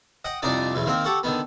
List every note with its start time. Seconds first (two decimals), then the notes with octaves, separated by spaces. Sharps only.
0.25 D#5 F#5 G5
0.42 C2 F2 D4 D#4 D5 D#6
0.75 B1 E2 B2
0.86 D#3 A#3 C4
1.04 G4 A4 F#5 C#6
1.23 D3 D#3 B3